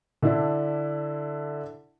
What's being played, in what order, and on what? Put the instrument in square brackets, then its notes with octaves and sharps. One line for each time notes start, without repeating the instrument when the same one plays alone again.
[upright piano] D3 D4 E4